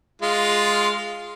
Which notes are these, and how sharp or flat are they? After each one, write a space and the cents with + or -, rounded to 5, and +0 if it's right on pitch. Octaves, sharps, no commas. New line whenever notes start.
G#3 +0 F4 +0